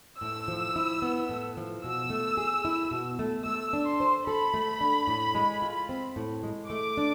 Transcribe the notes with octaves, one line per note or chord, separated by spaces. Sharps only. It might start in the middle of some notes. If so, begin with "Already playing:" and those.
A2 E6
F3
E4
B3
A2
F3
B2 E6
A3
G#4
E4
B2
A3
A3 E6
D4
C6
C5
A4 B5
A3
D4
A2
G#3
F4
C4
A2
G#3
A3 D6
D4